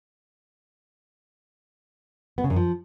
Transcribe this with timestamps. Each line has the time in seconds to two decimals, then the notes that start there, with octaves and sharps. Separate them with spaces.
2.38 B3
2.44 C#3
2.50 F#2
2.56 F3